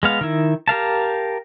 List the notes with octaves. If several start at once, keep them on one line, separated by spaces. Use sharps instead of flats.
G#3 B3 F5
D#3 E4
G4 A#4 F5 A5